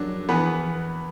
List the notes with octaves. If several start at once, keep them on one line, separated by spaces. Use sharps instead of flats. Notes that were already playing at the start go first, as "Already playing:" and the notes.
Already playing: F#2 F#3 D4
E2 E3 B3 B4